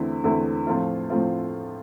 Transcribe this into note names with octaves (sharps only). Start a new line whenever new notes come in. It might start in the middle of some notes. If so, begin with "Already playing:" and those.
Already playing: E2 D3 A3 C4 E4
E2 D3 A3 C4 E4
A2 F3 A3 C4 F4
A2 F3 A3 C4 F4